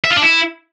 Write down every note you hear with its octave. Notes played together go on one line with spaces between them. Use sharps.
E5
F4
D4
E4